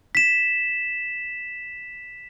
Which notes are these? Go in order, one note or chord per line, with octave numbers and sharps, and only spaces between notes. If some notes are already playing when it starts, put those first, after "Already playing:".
B6 E7